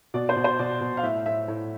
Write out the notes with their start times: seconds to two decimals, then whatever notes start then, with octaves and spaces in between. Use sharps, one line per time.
0.14 B2 D5
0.29 C5
0.36 B2
0.44 C5
0.59 B2 D5
0.81 B2
0.97 F5
1.03 A2 E5
1.26 A2 E5
1.48 A2